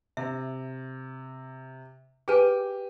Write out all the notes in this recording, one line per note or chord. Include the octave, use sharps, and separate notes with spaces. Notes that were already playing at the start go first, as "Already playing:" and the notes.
C3 E5
G4 G#4 B4 G#5 D#7